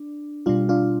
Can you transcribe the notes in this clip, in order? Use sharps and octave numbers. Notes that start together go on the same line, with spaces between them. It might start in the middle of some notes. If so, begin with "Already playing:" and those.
Already playing: D4
B2 G3 D4 F4
D4 F4